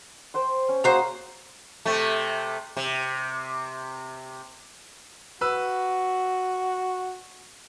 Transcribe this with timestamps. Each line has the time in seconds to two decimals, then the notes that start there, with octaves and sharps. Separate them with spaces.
0.34 C5 G5 C6
0.69 C#4
0.84 A#3 F#4 G#4 C5 A#5
1.85 C3 A3
2.77 C3
5.41 F#4 B4 E6